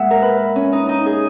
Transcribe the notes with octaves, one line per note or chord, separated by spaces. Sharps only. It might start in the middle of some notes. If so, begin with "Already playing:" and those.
Already playing: A#2 G#3 E5 F#5
A#4
B4
C#4
D#4
D#4
G#4